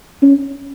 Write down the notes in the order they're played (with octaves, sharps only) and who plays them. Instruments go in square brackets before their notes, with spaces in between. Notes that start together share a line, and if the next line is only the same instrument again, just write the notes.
[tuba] C#4